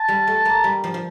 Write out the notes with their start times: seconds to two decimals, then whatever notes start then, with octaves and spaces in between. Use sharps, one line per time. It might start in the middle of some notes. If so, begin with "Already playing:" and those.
Already playing: A5
0.08 G3
0.27 A3
0.45 A#3
0.64 G3
0.84 F3
0.94 F3